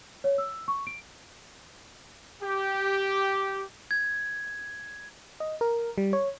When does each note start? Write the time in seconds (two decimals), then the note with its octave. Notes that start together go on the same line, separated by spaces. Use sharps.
0.24 C#5
0.38 E6
0.68 C#6
0.87 D7
2.43 G4
3.91 G#6
5.40 D#5
5.61 A#4
5.98 G3
6.13 C#5